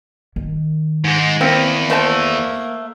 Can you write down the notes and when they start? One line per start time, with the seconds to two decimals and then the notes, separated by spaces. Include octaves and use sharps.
0.36 D#3
1.04 G#2 G#3
1.41 E2 A#3 C4
1.90 A3 A#3 C5 A5